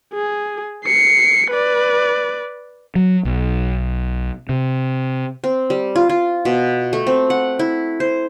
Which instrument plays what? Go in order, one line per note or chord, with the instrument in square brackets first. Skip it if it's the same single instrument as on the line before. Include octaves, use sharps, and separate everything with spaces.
[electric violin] G#4
C7 C#7
B4 D5
[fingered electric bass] F#3
B1
C3
[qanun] C4
G3
F4
F4
B2
A3
C4
F#5
E4
C5